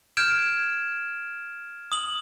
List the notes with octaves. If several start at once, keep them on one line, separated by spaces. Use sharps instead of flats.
F6 G6 G#6 D7 E7
D#6 F#7